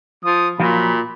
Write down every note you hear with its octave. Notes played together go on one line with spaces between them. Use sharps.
F3 D#6
A#2 F3 F#3 B5